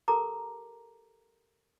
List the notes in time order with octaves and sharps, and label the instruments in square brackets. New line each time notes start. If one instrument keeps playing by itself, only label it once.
[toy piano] G4 A4 A#4 A5 A#5 D6